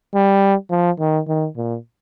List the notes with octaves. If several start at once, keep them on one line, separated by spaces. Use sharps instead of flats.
G3
F3
D#3
D#3
A#2